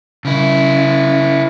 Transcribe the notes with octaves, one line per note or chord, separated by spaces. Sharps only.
C#3 E4